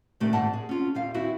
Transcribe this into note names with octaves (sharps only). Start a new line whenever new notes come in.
A2 C3 D#3 A3 D4 G4
G#2 G4 D5 F#5 A5
G#4
C#4 F4
D#2 G3 F5
B3 C4 E4 F#4